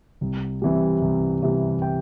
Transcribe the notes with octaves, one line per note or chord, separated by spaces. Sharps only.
C2
C3 E3 G3
C2
C3 E3 G3
G5